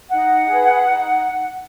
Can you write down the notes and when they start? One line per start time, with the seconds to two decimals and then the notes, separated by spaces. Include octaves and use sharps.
0.10 D#4 F#5
0.47 G#4 B4
0.86 D#4